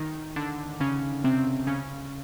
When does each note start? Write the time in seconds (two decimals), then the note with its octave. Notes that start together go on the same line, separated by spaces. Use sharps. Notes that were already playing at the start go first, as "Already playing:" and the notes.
Already playing: D#3 D#4
0.36 D3 D4
0.80 C#3 C#4
1.24 C3 C4
1.67 C#3 C#4